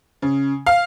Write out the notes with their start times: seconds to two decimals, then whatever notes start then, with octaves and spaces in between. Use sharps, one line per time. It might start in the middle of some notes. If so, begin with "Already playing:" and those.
0.22 C#3
0.66 F5